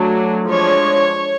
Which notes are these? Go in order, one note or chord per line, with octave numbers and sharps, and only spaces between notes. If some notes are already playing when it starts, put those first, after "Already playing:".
Already playing: F#3 A3 D4
F3 G#3 D4 C#5